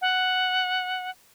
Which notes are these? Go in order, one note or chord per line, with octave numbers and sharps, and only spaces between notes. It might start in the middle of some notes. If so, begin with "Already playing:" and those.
F#5